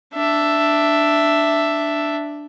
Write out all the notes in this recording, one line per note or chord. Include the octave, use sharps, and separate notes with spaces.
D4 E5